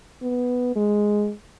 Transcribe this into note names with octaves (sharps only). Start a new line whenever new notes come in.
B3
G#3